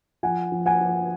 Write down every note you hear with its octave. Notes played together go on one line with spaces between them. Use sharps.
F3 F#5 G#5
F3
F#5 G#5
F3